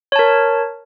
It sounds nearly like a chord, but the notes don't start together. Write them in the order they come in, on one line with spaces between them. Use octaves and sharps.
C#5 A5 A#4